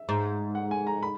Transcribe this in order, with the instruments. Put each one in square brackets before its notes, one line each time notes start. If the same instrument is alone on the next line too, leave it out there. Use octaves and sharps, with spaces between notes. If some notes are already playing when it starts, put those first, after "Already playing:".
Already playing: [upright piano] E5
[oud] G#2
[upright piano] F#5
G#5
A#5
B5